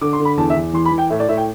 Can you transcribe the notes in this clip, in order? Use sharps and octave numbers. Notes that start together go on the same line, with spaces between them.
D3 D6
C6
D3
B5
E2 A5
E5
E2
E3 C6
B5
E3
G5
A2 E5
D5
A2 E5
G5